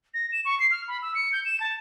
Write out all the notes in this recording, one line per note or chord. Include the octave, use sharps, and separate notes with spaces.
A#6
E7
C#6
C7
F6
B5
E6
C#7
G6
E7
A5